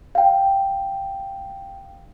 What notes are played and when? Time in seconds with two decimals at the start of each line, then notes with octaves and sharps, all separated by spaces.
0.15 F5 G5